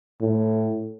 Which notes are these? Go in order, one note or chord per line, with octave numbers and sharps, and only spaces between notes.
A2